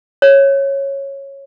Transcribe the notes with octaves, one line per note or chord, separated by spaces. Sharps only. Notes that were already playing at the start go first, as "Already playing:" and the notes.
C#5